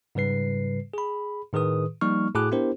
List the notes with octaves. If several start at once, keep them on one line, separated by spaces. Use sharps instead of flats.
G#2 C#3 G3 B4 C7
G#4 B5
A2 D#3 G#4 B4 D#6
F3 G3 A#3 D#4 C#6 F6
A2 A3 F#4 G#4 D6 F#6
B3 D4 E4 G4 A#4 C5